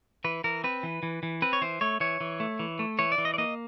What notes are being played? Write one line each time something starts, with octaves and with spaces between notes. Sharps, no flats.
E3 B4
E3 A#4
C4 B4
E3
E3
E3
C4 B4
C#5
E3 C5
A3 C#5
E3 C#5
E3
A3
E3
A3
E3 C#5
D5
E3
D#5
D5
A#3 D#5